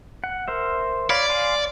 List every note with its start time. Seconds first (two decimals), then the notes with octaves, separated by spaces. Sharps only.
0.24 F#5
0.48 A#4 C5 E5
1.10 C#5 D5 F5 B5
1.29 F5 G#5 C6